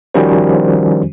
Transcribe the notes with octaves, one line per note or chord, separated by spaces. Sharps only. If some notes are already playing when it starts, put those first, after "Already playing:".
D#3 F3 G3 C#4 F#4 C5